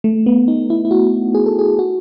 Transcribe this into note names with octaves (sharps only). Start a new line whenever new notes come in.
A3
B3
D#4
E4
E4
F#4
G#4
A4
G#4
F#4